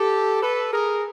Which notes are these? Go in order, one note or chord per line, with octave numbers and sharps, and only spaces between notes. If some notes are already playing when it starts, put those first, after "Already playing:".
Already playing: G4 A4
A4 B4
G#4 A#4